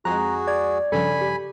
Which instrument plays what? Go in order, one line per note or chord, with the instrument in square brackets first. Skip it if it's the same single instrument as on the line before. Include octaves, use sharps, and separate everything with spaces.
[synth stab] F2 G#3 [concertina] F#4 G#4 [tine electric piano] A#5 [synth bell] F#6
[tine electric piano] D5 [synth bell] G#6
[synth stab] G2 C#3 F3 [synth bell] A4 [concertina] G#5 B5
[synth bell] G4